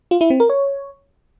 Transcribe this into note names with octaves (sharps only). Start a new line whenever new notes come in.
F4
E4
C4
A#4
C#5